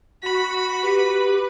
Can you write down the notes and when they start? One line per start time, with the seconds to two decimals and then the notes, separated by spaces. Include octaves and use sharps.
0.23 F#4 B5
0.82 G4 B4